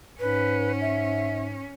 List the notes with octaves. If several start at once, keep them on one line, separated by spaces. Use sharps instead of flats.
G#2 C#4 B4
E5